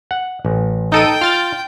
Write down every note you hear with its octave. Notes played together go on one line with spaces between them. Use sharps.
F#5
A1
D#4 A4 G5 D#7
F4 F6 A6